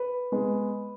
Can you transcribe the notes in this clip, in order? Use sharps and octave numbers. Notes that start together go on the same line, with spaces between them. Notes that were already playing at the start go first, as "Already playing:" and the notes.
Already playing: B4
G#3 B3